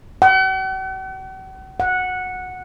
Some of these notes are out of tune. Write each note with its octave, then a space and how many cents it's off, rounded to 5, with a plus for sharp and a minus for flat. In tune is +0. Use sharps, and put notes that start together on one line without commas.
F#5 +45
F#5 -10